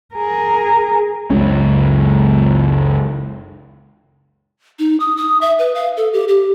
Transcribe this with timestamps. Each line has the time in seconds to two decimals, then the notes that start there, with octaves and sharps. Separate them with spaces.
0.15 G#4 A#4
1.30 F#1 C#2 G#3 C#4
4.79 D#4
5.00 D#6
5.17 D#6
5.41 E5
5.59 B4
5.75 F5
5.97 A4
6.13 G4
6.28 G4